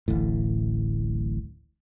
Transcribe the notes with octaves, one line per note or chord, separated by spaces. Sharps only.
D1 A1 A2